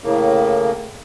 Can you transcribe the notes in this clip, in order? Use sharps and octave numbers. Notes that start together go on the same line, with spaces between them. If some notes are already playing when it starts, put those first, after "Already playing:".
A2 C#3 A#3